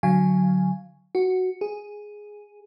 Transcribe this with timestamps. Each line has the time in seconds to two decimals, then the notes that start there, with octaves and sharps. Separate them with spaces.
0.03 D3 F#3 F5 G#5
1.15 F#4
1.61 G#4